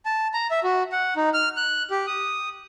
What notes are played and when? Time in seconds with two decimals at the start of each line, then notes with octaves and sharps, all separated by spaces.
0.05 A5
0.34 A#5
0.51 E5
0.64 F#4
0.92 F#5
1.16 D#4
1.34 F6
1.57 F#6
1.91 G4
2.07 D#6